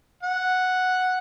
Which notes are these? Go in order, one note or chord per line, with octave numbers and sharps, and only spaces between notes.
F#5